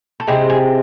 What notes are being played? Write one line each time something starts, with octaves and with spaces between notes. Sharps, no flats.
A4
C3 G#3 C4 E4 G#4
G#4